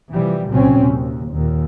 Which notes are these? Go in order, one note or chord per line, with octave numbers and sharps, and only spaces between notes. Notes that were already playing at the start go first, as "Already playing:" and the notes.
C3 E3 F3 G3
C2 A#2 C#3 F#3 C4 C#4
D#2 C3
D#2 A#2